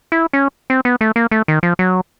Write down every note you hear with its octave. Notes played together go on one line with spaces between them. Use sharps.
E4
C#4
C4
B3
A3
A#3
A3
D#3
F3
F#3